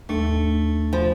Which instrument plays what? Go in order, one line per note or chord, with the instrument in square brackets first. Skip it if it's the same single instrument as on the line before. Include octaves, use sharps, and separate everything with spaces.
[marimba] D#2 G#2 D4 [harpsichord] A3
[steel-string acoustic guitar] F3 [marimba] B5